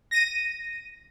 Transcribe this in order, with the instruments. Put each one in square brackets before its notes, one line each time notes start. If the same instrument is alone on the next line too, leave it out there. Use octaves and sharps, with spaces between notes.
[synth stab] A#6 D#7